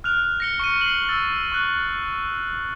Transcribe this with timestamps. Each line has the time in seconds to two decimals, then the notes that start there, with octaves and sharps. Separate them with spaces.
0.04 F6 F#6 F7
0.40 A#6 C#7 G7
0.59 C#6 C#7 D#7
0.81 C7 C#7 F#7
1.09 E6 A6
1.52 C#6 F#6